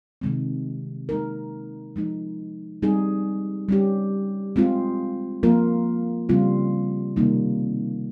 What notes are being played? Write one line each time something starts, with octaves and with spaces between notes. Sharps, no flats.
C3 D#3 G#3 C4
G#3 D#4 A#4
F3 G#3 D#4
G3 C4 D#4 G#4
G3 C#4 G4
G#3 C4 F4
F3 A#3 F4 A#4
C#3 G3 C4 F4
C3 D#3 G3 A#3 D#4